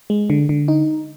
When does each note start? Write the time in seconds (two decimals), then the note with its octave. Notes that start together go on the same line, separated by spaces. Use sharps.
0.10 G#3
0.30 D3
0.49 D3
0.68 D#4